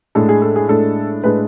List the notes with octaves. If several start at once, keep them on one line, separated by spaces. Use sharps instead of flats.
A2 G#3 D4 A4
G#4
A4
G#4
A2 G#3 D4 A4
A2 G#3 D4 B4